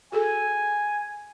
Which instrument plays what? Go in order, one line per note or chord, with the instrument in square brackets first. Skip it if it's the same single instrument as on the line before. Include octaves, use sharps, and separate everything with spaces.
[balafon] F#4 G#4 A4 [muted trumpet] G#5